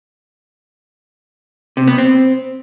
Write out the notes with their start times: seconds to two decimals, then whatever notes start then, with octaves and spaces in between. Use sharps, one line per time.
1.77 C3
1.88 B3
1.98 C4